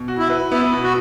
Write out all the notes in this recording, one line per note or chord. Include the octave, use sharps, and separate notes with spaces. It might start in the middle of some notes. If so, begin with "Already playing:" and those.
Already playing: B2
F#4
E4
B4
B3 E4
B2
F#4